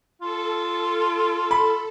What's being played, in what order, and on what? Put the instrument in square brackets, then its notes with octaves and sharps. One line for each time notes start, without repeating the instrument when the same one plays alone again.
[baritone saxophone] F4 [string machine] A4
[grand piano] B5